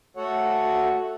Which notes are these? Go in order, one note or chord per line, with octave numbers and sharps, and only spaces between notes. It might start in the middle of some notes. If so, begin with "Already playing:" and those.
A3 F#4 A4 C#5 F#5